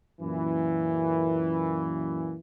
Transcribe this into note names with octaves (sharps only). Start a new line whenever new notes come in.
F#2 A#2 E3